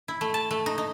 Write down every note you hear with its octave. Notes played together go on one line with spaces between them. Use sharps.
E4
A3
A5
A3
D#4
D#4